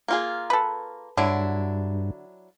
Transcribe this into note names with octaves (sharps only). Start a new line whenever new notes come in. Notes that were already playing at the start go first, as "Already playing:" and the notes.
A#3 F4 G#4
A4 B4
G2 D3 F#3 D4 E4